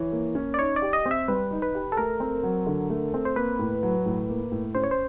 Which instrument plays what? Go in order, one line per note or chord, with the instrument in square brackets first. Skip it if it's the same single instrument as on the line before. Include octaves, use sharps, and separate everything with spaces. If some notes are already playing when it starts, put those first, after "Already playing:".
Already playing: [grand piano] E3 [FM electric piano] C#5
[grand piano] A#3
C#4
[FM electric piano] D5
[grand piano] D#4 [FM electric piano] C#5
[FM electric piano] D5
[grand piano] G4
[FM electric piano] D#5
[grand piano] C4
[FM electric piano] E5
[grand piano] G3 [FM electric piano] B4
[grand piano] D#4
[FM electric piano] B4
[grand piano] G4
[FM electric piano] A4
[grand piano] A3 [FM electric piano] A#4
[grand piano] C4
F#3
D3
A3
C4
[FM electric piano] C5
[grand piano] A#3 [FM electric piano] B4
[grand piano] A2
F#3
A2
A#3
A2
[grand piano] C#4 [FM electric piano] C5
[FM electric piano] C#5
C5